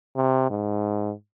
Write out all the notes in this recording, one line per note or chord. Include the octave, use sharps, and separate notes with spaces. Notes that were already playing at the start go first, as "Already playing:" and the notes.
C3
G#2